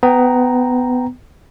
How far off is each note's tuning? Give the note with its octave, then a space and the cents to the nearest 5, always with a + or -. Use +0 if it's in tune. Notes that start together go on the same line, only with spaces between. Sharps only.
B3 +20 G5 +0 A#5 +0